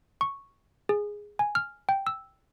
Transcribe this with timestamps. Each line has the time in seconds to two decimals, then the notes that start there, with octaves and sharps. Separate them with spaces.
0.21 C#6
0.89 G#4
1.39 G#5
1.55 F6
1.89 G5
2.07 E6